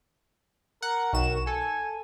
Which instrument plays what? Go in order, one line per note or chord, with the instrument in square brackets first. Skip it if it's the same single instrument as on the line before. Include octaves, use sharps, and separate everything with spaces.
[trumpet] A#4 [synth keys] F#5
[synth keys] B1 D#3 E7 [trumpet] F#4
[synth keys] A4 [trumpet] G#5